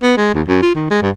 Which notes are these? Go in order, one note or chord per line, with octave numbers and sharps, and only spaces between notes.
B3
G#3
D#2
F#2
F4
D#3
G#3
G2